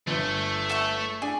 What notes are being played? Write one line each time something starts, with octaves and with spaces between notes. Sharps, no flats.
G1 A3
A4 E5 C#6
D4 G#4